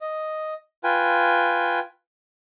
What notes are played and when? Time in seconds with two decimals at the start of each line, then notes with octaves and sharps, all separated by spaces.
0.01 D#5
0.84 F4 B4 G5 G#5